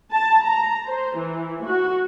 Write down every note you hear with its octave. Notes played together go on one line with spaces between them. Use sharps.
A5
A#5
C5
E3
F#4